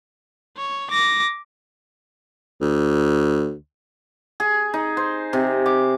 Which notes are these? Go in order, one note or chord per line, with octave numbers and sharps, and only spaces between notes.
C#5
D6 A#6
D2
G#4
D#4
C5
C3
D6